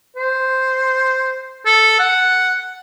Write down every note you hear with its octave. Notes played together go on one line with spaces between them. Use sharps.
C5
A4
F#5